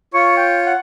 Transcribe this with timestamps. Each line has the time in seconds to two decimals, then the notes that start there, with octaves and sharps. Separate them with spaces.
0.14 F4 C#5 C#6
0.37 G5
0.66 F#5